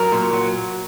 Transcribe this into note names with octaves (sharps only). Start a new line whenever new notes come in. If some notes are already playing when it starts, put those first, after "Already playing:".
Already playing: F#3 A#4
A#2
F#3